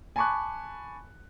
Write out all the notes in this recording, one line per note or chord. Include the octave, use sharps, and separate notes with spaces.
G#5 A5 B5 C#6 D6 F#6